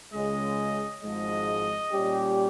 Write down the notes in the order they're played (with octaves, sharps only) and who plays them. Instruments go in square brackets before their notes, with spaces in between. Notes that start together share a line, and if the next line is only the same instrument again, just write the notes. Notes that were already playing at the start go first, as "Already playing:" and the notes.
[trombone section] C#2 C#3 G#3 [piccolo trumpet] D#5
[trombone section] G#1 G#2 F3 G#3 [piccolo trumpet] D#5
[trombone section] A#2 G3 C#4 G4